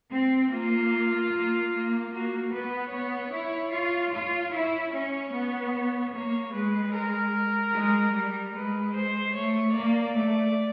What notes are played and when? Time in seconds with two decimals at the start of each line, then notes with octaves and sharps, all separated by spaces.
0.12 C4
0.52 A#3 F4
1.32 A#3
1.73 A#3
2.12 A#3 F#4
2.53 B3 B4
2.92 B3 C#5
3.33 E4
3.72 F4
4.13 F4
4.53 E4 C#5
4.93 C#4
5.33 B3
6.14 A#3 C#5
6.53 G#3 B4
6.94 A#4
7.73 G#3
8.14 G3
8.54 G#3 B4
8.94 C5
9.35 A3 C#5
9.74 A#3 D5
10.14 A3